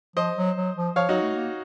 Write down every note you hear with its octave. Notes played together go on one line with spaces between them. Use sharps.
F3 C5 D#5
F#3
F#3
F3
F3 C#5 F5
F#3 D#4 F#4
A3
A#3